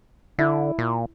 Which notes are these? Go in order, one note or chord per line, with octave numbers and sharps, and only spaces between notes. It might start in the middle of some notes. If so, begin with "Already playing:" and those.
D3 E4
A#2